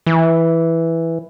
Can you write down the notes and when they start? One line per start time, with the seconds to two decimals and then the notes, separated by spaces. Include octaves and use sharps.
0.07 E3